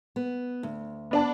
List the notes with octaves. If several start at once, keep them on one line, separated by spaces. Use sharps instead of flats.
B3
D2
B3 D4 A5